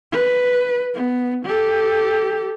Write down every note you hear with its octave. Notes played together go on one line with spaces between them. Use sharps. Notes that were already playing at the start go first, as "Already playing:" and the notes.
B4
B3
G4 A4